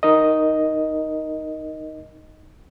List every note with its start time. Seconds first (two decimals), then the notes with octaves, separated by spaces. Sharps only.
0.03 D#4 A#4 D#5